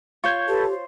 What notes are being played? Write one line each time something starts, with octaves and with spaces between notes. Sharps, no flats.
F4 C#5 C#6 G6 G#6
G4 A4 B4 A5
C5